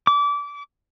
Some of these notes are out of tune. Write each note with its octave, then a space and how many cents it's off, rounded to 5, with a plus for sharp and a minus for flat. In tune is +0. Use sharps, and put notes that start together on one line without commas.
D6 -25